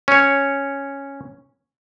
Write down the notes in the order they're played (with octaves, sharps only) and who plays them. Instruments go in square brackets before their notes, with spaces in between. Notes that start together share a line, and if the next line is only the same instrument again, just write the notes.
[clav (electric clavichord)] C#4 C#5